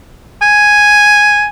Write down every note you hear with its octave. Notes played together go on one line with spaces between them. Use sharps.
G#5